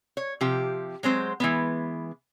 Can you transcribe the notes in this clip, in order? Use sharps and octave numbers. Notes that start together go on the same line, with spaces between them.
C#5
C3 F3 G4
F#3 G#3 C4 C5
E3 G#3 B3